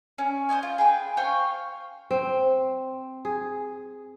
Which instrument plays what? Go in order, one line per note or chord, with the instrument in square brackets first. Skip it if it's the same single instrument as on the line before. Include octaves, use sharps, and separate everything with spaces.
[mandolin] C#4
C5 D5 D#5 G#5
F4
G#4 B4 G5
C5 C#5 F5 G5
[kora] C4
G#4